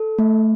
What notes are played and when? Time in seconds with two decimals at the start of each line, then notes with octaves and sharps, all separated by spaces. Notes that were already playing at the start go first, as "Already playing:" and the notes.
Already playing: A4
0.19 A3